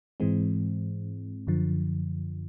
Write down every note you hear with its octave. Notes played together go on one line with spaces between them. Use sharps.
G#2 E3 G#3 C4
F#2 D3 F3